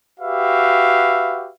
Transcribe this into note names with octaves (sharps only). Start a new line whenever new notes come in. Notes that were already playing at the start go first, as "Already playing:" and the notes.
F#4 G4 B4 E5 F5